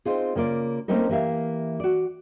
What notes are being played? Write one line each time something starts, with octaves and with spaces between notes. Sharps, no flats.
C4 D#4 F4 G#4
C#3 A#3 F4 D5
A3 A#3 C4 C#4 D#4 A#4
E3 A#3 G4 E5 F5
F#4 D5